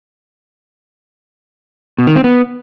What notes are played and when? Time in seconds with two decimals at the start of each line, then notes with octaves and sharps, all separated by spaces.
1.98 B2
2.07 D#3
2.16 C4
2.24 B3